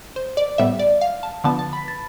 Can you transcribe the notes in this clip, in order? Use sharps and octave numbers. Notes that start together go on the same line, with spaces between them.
C5
D5
A2 G3 B3 E5
D5
F5
A5
D3 F3 B3 A5
A5
B5
A5